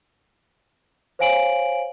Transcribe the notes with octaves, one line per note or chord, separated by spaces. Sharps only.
C5 C#5 F5 G#5 D7 F#7